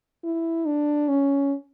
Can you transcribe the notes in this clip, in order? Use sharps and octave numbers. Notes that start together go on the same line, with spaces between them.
E4
D4
C#4